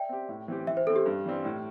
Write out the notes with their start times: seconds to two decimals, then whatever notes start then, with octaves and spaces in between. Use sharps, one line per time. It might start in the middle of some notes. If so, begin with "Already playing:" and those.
Already playing: D5 E5 G5
0.09 C4 G4
0.29 A2
0.48 E3 C4 G4
0.67 E3 E5
0.77 C5
0.87 C4 E4 A4
0.96 G4
1.06 G2
1.25 E3 G3 C4
1.45 A2